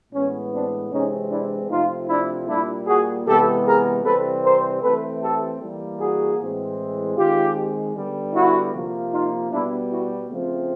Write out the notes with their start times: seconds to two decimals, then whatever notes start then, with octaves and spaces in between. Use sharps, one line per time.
0.13 A2 E3 G#3 B3 C#4
0.52 C4 D4
0.91 C3 E3 G#3 C4 C#4 D#4
1.30 D4 E4
1.69 C3 F3 A3 C4 D#4 F4
2.08 D4 E4
2.48 A#2 G3 A#3 D4 E4
2.86 F#4 G#4
3.25 C3 E3 G#3 B3 G4 A4
3.65 G#4 A#4
4.04 C3 E3 G3 C4 A4 B4
4.43 A#4 C5
4.82 E3 A3 C4 A4 B4
5.21 G4 A4
5.60 E3 G3 A#3
5.99 F#4 G#4
6.38 A2 E3 G#3 C4
7.17 D#3 G#3 C4 F4 G4
7.95 D3 G3 B3
8.34 E4 F#4
8.74 C3 F3 A#3
9.12 D#4 F4
9.51 B2 G3 B3 D4 E4
9.90 E4 F#4
10.29 C#3 F3 A3 C4